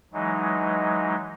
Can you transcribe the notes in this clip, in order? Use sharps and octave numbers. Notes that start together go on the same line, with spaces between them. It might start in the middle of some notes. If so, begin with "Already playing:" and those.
E3 F#3 G#3 D#4